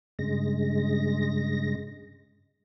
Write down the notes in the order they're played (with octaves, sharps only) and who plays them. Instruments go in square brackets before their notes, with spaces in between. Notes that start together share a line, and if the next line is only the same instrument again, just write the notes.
[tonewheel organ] G2 C#3 G#3 A#6